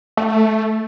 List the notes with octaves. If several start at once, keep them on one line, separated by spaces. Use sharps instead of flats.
A3